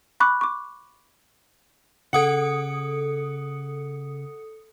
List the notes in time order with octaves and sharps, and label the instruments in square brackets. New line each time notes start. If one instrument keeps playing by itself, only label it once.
[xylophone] B5 C#6 D6 F#6
C#6 D6
[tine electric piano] C#3 [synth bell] A4 D#6 C#7 [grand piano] F#5